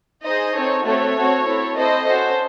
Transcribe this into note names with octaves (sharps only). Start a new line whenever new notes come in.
D#4 G#4 C5 D#5
C4 D#4 A4 C#5
A3 C4 F#4 A4 C#5
C4 F#4 A4
C4 E4 A4
C4 E4 A4 C5 D#5
C#4 F#4 A4 C5